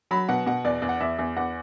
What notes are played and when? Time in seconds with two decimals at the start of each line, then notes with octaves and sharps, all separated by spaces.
0.11 F#3 B5
0.29 B2 F#5
0.46 B2 F#5
0.65 E2 D5
0.82 E2
0.89 F#5
1.00 E2 E5
1.19 E2
1.36 E2 F#5